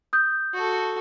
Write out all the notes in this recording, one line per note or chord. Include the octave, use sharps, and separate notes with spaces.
D#6 G6
F#4 A4